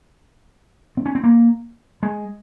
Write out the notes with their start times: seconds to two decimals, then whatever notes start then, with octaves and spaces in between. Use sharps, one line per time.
0.97 C4
1.06 C#4
1.15 C4
1.24 A#3
2.03 G#3